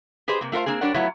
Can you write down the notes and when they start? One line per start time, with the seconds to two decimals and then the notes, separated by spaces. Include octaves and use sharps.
0.28 G4 G#4 B4 C5 D#5
0.41 C3 A#3
0.52 A3 F4 A#4 C5 F5
0.66 A#3 C4 D4 G#4
0.81 G3 D4 A#4 C#5 D5 F#5
0.94 F#3 A3 B3 E4 F4 C#5